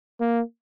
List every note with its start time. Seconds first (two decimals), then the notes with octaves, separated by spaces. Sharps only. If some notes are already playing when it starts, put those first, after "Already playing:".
0.20 A#3